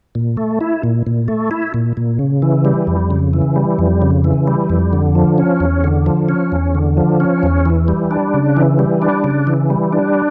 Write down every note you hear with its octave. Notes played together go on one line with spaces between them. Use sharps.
A#2
A3
E4
A#2
A#2
A3
E4
A#2
A#2
C#3
E3
G3
F2
C#3
E3
G3
F2
C#3
E3
G3
F2
D3
F3
C#4
E2
D3
F3
C#4
E2
D3
F3
C#4
E2
E3
G3
D4
C#3
E3
G3
D4
C#3
E3
G3
D4